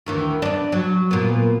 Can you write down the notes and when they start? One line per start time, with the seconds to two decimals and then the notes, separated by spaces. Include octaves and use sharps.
0.06 D2 D#3 E3
0.42 B3 D4
0.72 F#3
1.11 A#2 B3